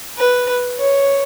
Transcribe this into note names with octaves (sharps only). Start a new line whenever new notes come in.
B4
C#5